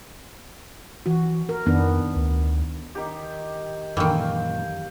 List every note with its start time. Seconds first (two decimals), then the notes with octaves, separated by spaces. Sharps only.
1.06 E3 F#4
1.49 A#4
1.66 F2 D#3 B3 D4
2.15 D2
2.95 D#3 G4
3.97 F#2 A#2 D#3 E3 F5 G5